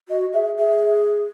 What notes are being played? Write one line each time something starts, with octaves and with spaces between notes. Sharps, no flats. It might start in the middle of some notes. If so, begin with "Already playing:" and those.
F#4 D#5
G#4 E5
G#4 E5